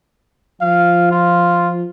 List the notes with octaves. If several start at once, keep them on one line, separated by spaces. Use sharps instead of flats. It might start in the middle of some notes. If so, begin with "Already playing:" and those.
F3 F5
F4